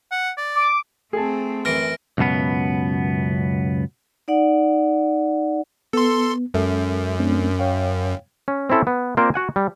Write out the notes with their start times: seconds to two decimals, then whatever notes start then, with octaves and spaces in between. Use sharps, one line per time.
0.12 F#5
0.38 D5
0.56 D6
1.13 A3 C4 G#4 A5
1.65 F#2 E3 F6 A#6 D7
2.18 C#2 F#2 B2 B3
4.28 D#4 D5 F#5
5.93 B3 A4 C6
6.54 F#2 G#3 A4 E5
7.20 A3 C4 D4
7.59 C#5 F5 G5
8.48 C#4
8.70 C4 C#4 E4 A4 C5
8.87 B3
9.17 A#3 C4 F4 A#4 C5 D5
9.34 F#4 F#5 G#5
9.56 G3